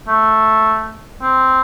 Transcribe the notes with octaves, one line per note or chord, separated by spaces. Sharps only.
A3
C4